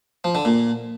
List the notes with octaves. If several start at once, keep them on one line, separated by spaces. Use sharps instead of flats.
F3
D3
A#2